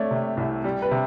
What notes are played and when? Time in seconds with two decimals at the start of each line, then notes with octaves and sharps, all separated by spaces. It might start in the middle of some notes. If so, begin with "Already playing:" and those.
Already playing: A3 C#5 D5
0.11 C3
0.37 C2
0.64 G3
0.82 B4
0.91 C3